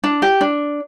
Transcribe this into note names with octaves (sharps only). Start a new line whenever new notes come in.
D4
G4
D4